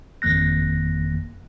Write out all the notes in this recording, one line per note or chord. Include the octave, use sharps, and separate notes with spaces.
G1 F2 D#3 A#3 F#6 A#6